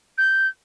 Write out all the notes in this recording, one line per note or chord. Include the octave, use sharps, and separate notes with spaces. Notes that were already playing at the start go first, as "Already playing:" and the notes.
G6